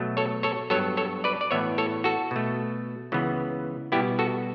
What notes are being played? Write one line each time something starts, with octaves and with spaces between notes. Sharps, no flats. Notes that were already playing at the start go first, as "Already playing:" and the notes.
Already playing: B2 F#3 A3
A4 C#5
A4 C#5
G2 F#3 B3 A4 C#5
A4 C#5
B4 D5
D5
A2 E3 B3 C#5 E5
A4 C#5
F#4 A4
B2 A3
C#2 C#3 E3 B3
B2 G3 B3 E4 G4
F#4 A4